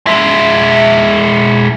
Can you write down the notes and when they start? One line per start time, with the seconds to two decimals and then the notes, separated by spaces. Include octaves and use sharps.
0.07 G#3 E4